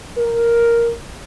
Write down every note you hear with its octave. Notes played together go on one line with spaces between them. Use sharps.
A#4